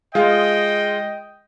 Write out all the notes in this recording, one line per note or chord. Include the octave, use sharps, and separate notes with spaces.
G#3 F4 D#5 G5